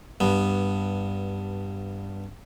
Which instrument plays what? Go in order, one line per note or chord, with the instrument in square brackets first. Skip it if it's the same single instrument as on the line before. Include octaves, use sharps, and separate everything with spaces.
[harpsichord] G2 B3